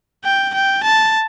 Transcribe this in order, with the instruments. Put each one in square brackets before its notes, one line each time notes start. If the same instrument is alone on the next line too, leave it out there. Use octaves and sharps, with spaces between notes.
[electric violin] G5
G5
A5